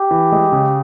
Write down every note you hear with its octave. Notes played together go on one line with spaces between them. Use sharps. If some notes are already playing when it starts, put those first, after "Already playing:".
Already playing: G4
E3
G#3
C#3